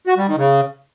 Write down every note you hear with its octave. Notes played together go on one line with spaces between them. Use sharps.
F#4
G3
D#3
C#3